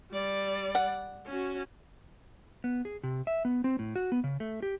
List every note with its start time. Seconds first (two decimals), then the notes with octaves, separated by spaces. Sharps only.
0.11 G3 D5
0.75 F#5
1.27 C#4 F#4
2.64 B3
2.85 G#4
3.03 C3
3.27 E5
3.45 B3
3.64 C4
3.79 A2
3.96 F#4
4.12 B3
4.24 C#3
4.40 A3
4.62 G4